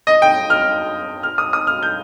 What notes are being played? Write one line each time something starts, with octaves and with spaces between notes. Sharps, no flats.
D#5
G5
F6
F6
D#6
D#6
F6
G6